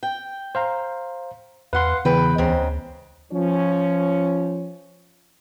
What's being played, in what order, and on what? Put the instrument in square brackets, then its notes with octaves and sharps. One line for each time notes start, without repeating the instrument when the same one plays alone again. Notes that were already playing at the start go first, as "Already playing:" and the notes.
[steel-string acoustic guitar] G5
[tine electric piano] C5 F5 A#5
[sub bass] E2 [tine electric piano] B4 C6 [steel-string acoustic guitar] F5 F#5
[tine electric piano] E2 [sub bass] C#3 [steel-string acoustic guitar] B4 G5
[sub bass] D2 [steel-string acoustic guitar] G#2 C#3 C4
[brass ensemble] F3 C#4